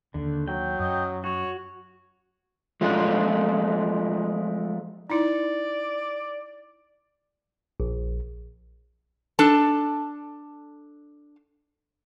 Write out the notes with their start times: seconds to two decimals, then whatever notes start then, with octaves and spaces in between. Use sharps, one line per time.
0.14 D#2 D3
0.48 F#3 G5
0.79 F#2 D#5
1.24 F#4 C#5
2.81 F3 G#3 A3 F4
5.10 D#4 E4 D5
7.80 A#1
9.39 D4 A4 A5